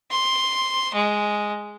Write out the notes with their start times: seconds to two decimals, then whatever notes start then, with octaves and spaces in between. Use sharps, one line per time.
0.11 C6
0.94 G#3